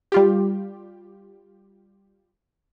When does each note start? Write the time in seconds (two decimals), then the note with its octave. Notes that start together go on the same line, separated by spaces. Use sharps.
0.12 G3 F4 G4